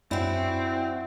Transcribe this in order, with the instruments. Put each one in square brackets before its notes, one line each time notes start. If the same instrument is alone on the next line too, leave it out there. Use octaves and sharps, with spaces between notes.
[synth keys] F#2 D5 G#5 [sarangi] C4 [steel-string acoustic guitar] E4 F#4